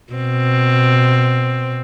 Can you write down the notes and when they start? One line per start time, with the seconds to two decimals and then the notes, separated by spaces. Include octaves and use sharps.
0.13 B2 C4